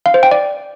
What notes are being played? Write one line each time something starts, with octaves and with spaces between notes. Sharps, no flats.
F5
C5
G5
D5